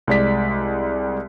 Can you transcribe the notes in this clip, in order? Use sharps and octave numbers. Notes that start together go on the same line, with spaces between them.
C2 G#3 D5 B6